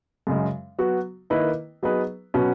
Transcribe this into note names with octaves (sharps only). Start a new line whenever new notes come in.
F#2 C#3 G#3
F#3 B3 F#4
D#3 A#3 E4 B4 D#5
F#3 B3 D#4 G#4 B4
B2 F#3 C#4 F#4 B4